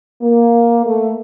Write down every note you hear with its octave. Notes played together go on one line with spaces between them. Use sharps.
A#3
A3